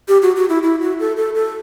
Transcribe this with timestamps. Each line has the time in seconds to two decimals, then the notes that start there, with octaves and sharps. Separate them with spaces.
0.08 G4
0.22 F#4
0.36 F#4
0.49 E4
0.63 E4
0.81 F#4
1.00 A4
1.17 A4
1.35 A4